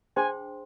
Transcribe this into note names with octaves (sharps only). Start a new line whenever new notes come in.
D4 G#4 C5 G5 G#5 C6